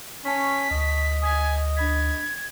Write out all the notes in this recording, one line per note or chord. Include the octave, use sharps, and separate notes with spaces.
C#4 A5 C#6 B6
D2 D#5
G#5 D#6 G#6 B6
D4 B5 G#6 B6